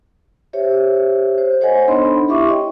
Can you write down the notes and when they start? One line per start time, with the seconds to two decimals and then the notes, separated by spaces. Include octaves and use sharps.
0.53 G4 C5 C#5 E5
1.38 C5
1.61 A4 C5 C#5 D#5 F#5 G#5
1.88 B3 D4 D#4 B5 C6
2.28 E4 G4 E5 C#6 D6
2.49 C#5 D#5 G5